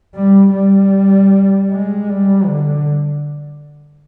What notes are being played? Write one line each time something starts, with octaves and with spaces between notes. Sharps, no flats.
G3
G3
G#3
G3
D3